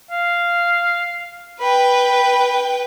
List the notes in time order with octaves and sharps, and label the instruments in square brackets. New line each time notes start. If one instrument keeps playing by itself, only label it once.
[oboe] F5
[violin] B4 G5 [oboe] B5